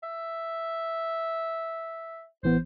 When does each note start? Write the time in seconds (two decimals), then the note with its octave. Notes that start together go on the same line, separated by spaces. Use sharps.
0.03 E5
2.43 A1 E3 B3 C5